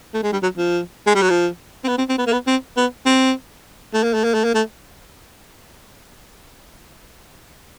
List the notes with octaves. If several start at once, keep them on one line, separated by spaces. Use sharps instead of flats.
A3
G#3
G3
F#3
F3
G#3
G3
F#3
F3
C4
B3
C4
C4
B3
A#3
B3
C4
B3
C4
A3
A#3
A3
A#3
A3
A#3
A3